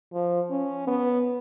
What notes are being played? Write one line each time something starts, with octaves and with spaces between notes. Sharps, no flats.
F3
C#4
B3